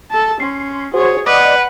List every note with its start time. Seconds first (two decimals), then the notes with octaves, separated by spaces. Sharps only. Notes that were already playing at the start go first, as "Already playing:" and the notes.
0.11 A4 A5
0.40 C#4 C6
0.94 F#4 G#4 C5 C#5
1.26 B4 D5 D#5 F#5